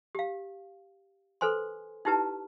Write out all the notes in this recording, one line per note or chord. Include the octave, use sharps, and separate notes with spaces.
G4 F5
A4 B4 C5 G#5 C6
D#4 E4 G4 B4 A5